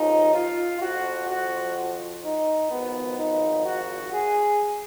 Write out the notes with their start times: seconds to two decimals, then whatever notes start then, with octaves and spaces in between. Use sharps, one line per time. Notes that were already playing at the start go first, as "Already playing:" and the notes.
Already playing: D#2 C#3 F3 D#4
0.35 F4
0.82 F2 F3 F#4
1.29 F#4
2.24 D#4
2.71 G#1 G#2 F3 B3
3.18 D#4
3.65 F#4
4.13 G#4